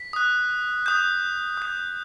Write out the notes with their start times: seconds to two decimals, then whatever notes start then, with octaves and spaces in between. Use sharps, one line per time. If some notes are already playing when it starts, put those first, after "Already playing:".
Already playing: B6
0.13 D#6 F#6
0.86 D#6 G6
1.57 D#6 G6